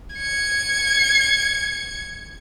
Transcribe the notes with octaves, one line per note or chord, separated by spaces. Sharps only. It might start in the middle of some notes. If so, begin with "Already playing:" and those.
G#6 C#7